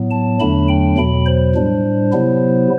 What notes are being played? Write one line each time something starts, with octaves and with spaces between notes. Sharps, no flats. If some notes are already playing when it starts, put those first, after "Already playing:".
Already playing: A2 F#3 B3
A5
E2 D3 F#3 A3 D4 B5
G5
E2 B2 F#3 B5
C5
A2 G3 D4
C3 F#3 B3 E4